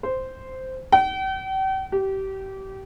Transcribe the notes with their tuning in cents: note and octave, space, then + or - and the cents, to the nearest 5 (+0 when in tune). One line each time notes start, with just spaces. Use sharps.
C5 -5
G5 -40
G4 -25